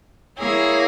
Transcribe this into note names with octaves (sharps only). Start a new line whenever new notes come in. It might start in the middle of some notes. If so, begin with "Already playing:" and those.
A#3 E4 G#4 C#5